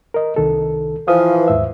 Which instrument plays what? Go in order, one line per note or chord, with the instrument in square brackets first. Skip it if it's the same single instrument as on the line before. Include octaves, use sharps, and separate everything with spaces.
[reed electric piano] A#4 D#5
C2 D#3 A4
[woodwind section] E3 F3 [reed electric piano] F5 D#6
[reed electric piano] D#2 G#2 E5